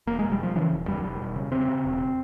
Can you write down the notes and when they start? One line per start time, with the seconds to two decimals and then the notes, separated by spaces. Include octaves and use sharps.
0.07 E1 A#3
0.19 G#3
0.23 E1
0.32 G3
0.39 E1 F3
0.55 C#3 E3
0.71 E1
0.88 E2 G3
1.03 E1 G3
1.20 E1
1.36 C#3
1.52 C#3 C4
1.68 C#3
1.84 E1